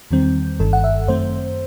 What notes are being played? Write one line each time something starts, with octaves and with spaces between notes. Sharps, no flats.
E2 D#3 G3 C4
G1 G2 D#3 A4
F#5
E5
F#2 D#3 A3 C4 C5